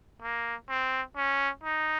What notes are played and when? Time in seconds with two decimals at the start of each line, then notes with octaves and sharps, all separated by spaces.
0.22 A#3
0.69 C4
1.17 C#4
1.64 D#4